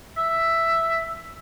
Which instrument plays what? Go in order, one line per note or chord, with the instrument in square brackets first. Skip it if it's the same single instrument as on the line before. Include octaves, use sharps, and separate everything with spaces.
[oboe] E5